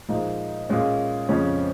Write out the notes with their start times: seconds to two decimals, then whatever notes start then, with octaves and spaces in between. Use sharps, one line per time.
0.09 A#2 F3 G#3 D#4
0.69 A#2 G#3 C#4
1.29 F2 C#3 F3 G#3 C#4